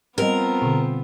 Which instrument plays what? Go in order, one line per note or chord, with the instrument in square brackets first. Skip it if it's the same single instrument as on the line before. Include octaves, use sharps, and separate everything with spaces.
[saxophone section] F3 C4 [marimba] G3 D#5 [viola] B3 [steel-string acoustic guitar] A#4
[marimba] B2 D3